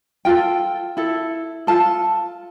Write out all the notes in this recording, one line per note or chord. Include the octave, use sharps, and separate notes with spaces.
F4 A4 G5
E4 A4
F4 A4 A5